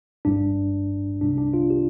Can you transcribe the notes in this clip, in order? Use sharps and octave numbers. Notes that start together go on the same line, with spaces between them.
G1 G2 G3 D4
C2 C3 G3 D4
D4
F4
G4